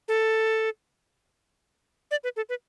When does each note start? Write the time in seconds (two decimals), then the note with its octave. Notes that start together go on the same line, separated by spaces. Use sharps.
0.08 A4
2.11 D5
2.24 B4
2.36 A4
2.49 B4